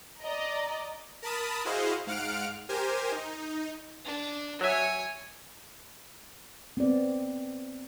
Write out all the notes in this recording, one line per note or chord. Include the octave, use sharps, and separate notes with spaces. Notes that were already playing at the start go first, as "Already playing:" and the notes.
D5 D#5 A#5
A#4 A5 B5 D#6
E4 F#4 G#4 C5 D#5 F5
G#2 F5 F#5 F6 D7
G4 A#4 C5 G#5
D#4
D4
F#3 C#5 E5 G#5
B3 C4 D5